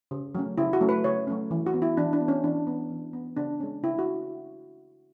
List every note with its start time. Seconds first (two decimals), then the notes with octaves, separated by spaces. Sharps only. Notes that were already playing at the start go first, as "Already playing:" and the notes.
0.11 C#3
0.35 F#3 A3 C#4
0.58 C#3 E4
0.73 F#4
0.81 F#3 A3 C#4
0.89 B4
1.04 C#3 C#5
1.27 F#3 A3 C#4
1.51 E3
1.66 F#4
1.74 B3
1.82 E4
1.97 E3 D4
2.13 D4
2.21 B3
2.28 C#4
2.44 E3 D4
2.67 B3
2.90 E3
3.13 B3
3.37 C#3 D4
3.60 G#3 C#4
3.83 C#3 E4
3.99 F#4